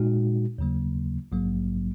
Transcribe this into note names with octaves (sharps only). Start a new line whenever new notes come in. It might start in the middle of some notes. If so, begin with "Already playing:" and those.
Already playing: A#2 G#3 D#4 F#4
D#2 C#3 F#3 A#3
A#1 G#2 F#3 A#3